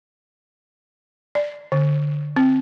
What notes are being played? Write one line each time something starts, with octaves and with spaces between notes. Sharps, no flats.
D5
D3
C4